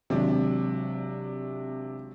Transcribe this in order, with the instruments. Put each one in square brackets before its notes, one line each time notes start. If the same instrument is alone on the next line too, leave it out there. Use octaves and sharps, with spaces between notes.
[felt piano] G#1 F#3 [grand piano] C3 D4